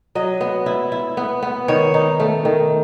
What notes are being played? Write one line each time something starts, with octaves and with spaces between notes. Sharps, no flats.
F#3 D#5
B3
E4
E4
B3
B3
D#3 C#5
D#4
A3
D#3